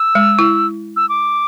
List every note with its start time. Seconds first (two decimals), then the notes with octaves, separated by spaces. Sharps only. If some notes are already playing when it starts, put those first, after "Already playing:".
Already playing: E6
0.15 G#3
0.39 E4
0.96 E6
1.09 D6